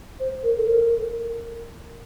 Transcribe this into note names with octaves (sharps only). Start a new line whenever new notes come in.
C5
A#4
A4
A#4